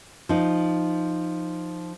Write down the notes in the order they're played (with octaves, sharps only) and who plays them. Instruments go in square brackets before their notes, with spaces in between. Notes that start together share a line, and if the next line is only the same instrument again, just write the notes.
[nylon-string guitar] F3 D#4